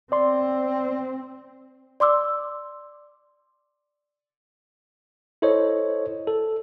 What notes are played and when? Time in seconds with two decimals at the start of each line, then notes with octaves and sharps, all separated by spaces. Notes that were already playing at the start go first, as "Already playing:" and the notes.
0.12 C4 D5 C6
2.00 D5 C6 D6 E6
5.42 E4 A4 C5 C#5 D#5
6.27 A4